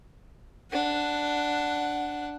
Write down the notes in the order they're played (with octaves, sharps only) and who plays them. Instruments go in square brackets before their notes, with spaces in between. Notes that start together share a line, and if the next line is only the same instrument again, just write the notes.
[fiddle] D4 F#5